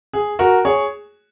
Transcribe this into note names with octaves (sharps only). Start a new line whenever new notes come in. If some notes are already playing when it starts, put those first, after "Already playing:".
G#4
F#4 A#4
G#4 C#5